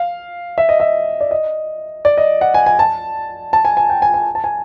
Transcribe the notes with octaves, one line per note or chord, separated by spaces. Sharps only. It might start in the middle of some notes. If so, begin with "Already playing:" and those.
Already playing: F5
E5
D#5
E5
D5
D#5
D5
D#5
F#5
G#5
G#5
A5
A5
G#5
G#5
G5
G#5
G#5
A5
G#5